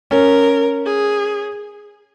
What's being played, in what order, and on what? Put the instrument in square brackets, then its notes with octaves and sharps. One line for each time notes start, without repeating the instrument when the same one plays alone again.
[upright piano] C#4 [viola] A#4
[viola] G#4